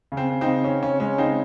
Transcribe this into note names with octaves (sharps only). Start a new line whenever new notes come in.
C#3
C4
C4
C4 D#4
C#3
C4 C#4
C#3 C#4
G#3 C#4
C#3 C4 D#4